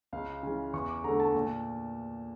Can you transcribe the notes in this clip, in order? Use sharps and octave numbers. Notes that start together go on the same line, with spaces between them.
C#2 F5
C#3 E3
E2 C#6
D6
D3 A3 A#5
A5
A#2